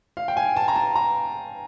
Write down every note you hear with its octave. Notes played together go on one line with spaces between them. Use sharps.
F5
G5
G#5
A5
A#5
A5
A#5